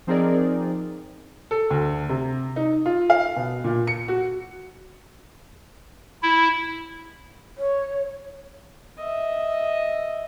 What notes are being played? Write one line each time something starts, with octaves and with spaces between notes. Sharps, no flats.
F3 C4 D#4 G#4 A#4 D5
A4
D2
C3
D#4
F4
F5
B2
A#2
C#7
F#4
E4
C#5
D#5 E5